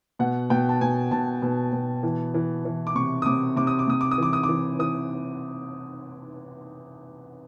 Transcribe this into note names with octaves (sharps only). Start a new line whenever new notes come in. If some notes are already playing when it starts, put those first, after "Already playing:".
B2 F#5
B2 G5
A5
B2 G#5
B2 A5
B2
B2
E3
E3
E3
D6
C3 C#6
D#6
C3 D6
C3 D6
D#6
D6
C3 D#6
D6
D#6
E3 D6
D#6
D6
E3
E3 D#6